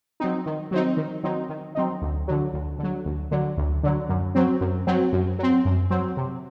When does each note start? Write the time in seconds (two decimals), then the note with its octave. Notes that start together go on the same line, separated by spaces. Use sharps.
0.20 F#3 C4 D#4
0.46 D#3
0.71 F#3 C4 D#4
0.97 D#3
1.24 F#3 C4 D#4
1.49 D#3
1.75 F#3 C4 D#4
2.02 D2
2.28 D3 F#3
2.53 D2
2.79 D3 F#3
3.05 D2
3.31 D3 F#3
3.57 D2
3.83 D3 F#3
4.09 F#2
4.35 F#3 C4
4.61 F#2
4.87 F#3 C4
5.12 F#2
5.39 F#3 C4
5.65 F#2
5.90 F#3 C4
6.17 C3